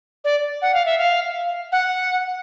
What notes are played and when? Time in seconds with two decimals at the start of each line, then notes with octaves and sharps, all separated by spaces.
0.24 D5
0.62 F#5
0.74 F5
0.86 E5
0.98 F5
1.72 F#5